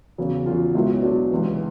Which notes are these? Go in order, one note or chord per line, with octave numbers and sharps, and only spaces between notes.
E2 C#3 F#3
E2 C#3 F#3 F4
C#2 B2 F#3 E4
C#4
C#2 B2 F#3 D4
C#2 C3 E3